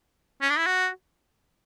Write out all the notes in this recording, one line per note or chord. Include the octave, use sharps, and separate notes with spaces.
C#4
D4
E4
F#4